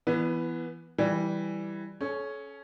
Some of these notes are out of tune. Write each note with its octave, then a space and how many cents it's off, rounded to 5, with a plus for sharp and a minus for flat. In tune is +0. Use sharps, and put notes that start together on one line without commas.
E3 +20 B3 +0
E3 +0 G3 +0
C#4 +0 A4 -40 C#5 +0